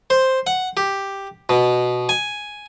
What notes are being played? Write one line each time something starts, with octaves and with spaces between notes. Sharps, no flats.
C5
F#5
G4
B2
G#5